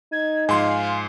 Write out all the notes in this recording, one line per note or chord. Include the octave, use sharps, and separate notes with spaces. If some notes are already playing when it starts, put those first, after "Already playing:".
D#4 G#6
G#2 F3 F5 G#5 C6